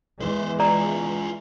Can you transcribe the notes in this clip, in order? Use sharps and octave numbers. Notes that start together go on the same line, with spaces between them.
E2 E3 G#3 B4 C5
F4 G#4 D5 A#5